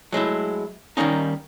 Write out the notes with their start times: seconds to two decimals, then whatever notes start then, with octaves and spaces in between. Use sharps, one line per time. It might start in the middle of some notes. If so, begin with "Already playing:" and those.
0.12 F#3 G#3 A3 E4
0.97 D#3 F#3 G3 A#3 C#4 D#4